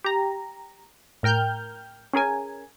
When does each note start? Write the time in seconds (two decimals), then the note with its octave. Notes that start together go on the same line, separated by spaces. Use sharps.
0.04 G4 A#5
1.23 A2 A#4 G5 F6 G6
2.13 C#4 G#4 A#4 G#5